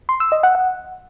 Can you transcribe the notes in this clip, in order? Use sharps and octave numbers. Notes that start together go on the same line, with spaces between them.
C6
E6
D#5
F#5
F#5